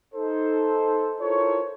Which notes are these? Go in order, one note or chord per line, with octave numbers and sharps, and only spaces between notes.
D#4 A4 C5
E4 F4 A4 A#4 C5 C#5